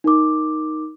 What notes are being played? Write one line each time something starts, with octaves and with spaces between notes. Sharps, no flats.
D#4 A#4 D6